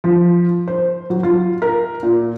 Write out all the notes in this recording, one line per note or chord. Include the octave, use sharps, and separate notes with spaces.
F3
C5
F#3
F4
A#4
A#2